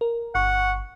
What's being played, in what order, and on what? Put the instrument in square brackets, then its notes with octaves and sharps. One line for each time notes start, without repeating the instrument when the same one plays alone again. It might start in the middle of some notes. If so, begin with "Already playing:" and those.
[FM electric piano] A#4
[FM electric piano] G1 C#6 [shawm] F#5